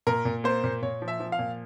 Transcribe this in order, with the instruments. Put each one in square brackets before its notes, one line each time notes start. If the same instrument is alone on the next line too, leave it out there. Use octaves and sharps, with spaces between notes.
[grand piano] A#2 A#4
A#2
A#3 C5
A#2
A#2 C#5
F3
E5
F3
F5
A#2